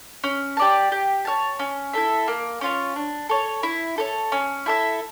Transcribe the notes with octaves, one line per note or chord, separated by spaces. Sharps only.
C#4
G4 D5 A5
G4
C#5 F5 A5
C#4
E4 A4 E5
A#3
C#4 F4 C#5
D4
A4 C#5
E4
A4 C#5
C#4
E4 A4 E5